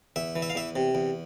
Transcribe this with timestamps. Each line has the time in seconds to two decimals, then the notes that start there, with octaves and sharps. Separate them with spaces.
0.16 E2 E5
0.36 E3
0.42 E5
0.50 F5
0.55 E2 E5
0.76 C3
0.95 E2